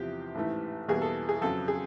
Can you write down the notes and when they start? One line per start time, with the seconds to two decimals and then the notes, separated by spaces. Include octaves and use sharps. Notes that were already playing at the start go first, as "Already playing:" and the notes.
Already playing: E2 C3 F3 G4
0.35 A1 G#2 E3 A3
0.88 E2 B2 G3 A#3 G#4
1.02 A4
1.29 G#4
1.42 F2 C#3 F#3 A4
1.68 G#4